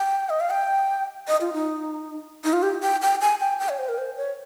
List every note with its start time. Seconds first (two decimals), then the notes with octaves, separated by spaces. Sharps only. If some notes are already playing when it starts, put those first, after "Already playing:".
Already playing: G5
0.29 D#5
0.40 F5
0.50 G5
1.27 D#5
1.41 F4
1.53 D#4
2.44 D#4
2.53 F4
2.63 G4
2.83 G5
3.02 G5
3.21 G#5
3.40 G5
3.60 G5
3.69 C#5
3.78 C5
3.88 A#4
3.98 C5
4.17 C#5